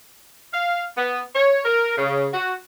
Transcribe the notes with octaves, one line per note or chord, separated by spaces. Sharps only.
F5
B3
C#5
A#4
C#3
F#4